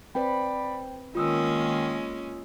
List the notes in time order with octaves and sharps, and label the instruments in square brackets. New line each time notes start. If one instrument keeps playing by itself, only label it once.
[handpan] C4 B4 [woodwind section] D5 B5 [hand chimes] G5
[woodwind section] D#3 [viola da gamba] G#3 A#3 C#4 [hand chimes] F4 D#6 E6